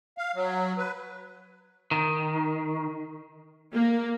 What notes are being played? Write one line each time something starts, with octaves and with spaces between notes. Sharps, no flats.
F5
F#3
B4
D#3
A#3